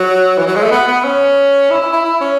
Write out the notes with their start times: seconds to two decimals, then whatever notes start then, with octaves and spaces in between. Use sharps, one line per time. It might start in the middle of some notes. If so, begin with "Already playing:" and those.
Already playing: F#3
0.38 E3
0.47 F#3
0.55 G#3
0.63 A3
0.72 B3
0.88 B3
1.04 C#4
1.71 E4
1.82 E4
1.93 E4
2.04 E4
2.21 C#4